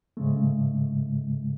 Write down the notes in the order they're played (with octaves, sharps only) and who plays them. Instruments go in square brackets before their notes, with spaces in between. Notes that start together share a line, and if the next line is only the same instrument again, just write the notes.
[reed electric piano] G#2 C#3 G#3 A3